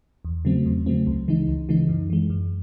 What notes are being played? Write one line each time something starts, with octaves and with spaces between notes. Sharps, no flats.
E2
C#3 F#3 A3 C4
E2
C#3 F#3 A3 C4
C#2
C#3 E3 G#3 D#4
C#2
C#3 E3 G#3 D#4
F#2
E3 G#3
F#2